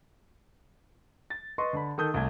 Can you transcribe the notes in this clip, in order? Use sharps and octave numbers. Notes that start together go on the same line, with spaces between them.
A6
B4 D#5 C6 C#6
D3 B5
D#3 A4 D#6 G6
C2 A3 G#6